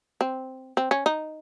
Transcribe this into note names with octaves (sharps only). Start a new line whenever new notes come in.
C4
C4
C#4
D#4